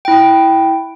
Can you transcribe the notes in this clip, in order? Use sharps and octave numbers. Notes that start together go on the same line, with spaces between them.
E4 G5